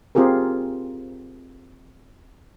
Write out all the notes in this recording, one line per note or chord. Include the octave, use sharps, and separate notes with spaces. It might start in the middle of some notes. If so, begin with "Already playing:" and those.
C4 F4 G4 G#4 A#4